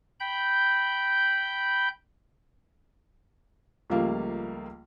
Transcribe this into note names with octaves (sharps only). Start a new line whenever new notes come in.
G5 B5 G6
C#2 F3 G3 A3 A#3 F5